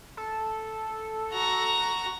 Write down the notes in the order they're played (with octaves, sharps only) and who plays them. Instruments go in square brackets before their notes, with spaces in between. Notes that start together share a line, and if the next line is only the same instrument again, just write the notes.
[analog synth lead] A4
[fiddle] F#4 A#5